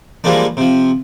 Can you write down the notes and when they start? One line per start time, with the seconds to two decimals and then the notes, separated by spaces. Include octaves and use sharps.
0.24 E3 F3 G3 G#3 A#3 D4
0.57 C3 F3